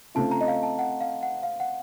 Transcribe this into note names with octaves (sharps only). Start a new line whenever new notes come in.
C#3 A3 C4 F4 A5
A#5
D#5
F5
A5
F#5
F5
F#5
F5
F#5